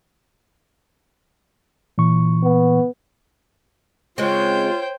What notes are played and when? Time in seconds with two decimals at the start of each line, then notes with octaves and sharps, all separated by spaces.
1.98 A#2 E3 C#6
2.43 B3
4.18 C#3 G#3 C4 F4 C5 C#5 G5